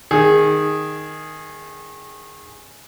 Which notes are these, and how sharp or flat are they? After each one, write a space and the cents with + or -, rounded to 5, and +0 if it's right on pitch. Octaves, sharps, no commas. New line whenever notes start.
D#3 +0 G#4 +0